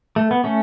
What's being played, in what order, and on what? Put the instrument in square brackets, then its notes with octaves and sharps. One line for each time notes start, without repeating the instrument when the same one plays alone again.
[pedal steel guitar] A3
B3
A3 C#4